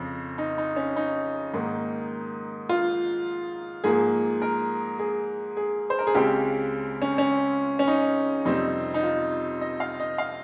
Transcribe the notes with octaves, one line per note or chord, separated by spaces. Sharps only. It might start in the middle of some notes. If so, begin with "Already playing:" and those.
Already playing: F2 C#3 C4
D#4
D#4
C#4
D#4
G#2 D#3 A#3
F4
G#2 F3 A#3 G#4
A#4
G#4
G#4
C5
A#4
G#4
C#2 C#3 G#3 C4 G4
C#4
C#4
C#4
D#4
F2 C3 G3 C4 D#4
D#4
F4
D#5
F5
D#5
F5